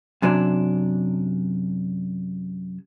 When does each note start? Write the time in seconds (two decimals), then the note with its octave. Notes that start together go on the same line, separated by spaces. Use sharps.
0.22 F#2 C3 F#3 D4